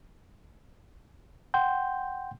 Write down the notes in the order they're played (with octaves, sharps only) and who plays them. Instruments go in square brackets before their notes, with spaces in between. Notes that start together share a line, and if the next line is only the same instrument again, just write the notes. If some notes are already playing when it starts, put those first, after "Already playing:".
[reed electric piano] F#5 G5 C6 G6